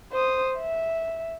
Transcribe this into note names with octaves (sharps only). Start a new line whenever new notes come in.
C5 D#6
E5